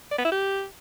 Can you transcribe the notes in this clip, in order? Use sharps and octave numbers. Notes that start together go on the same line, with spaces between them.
D5
B3
E4
G4